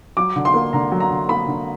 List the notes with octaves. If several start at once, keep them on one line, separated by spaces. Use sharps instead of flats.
F#3 D6
D3
C6
A#3
D3 A#5
F#3
A#5
D3
A#3 B5
D3